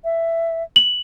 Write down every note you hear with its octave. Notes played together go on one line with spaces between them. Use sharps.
E5
F#7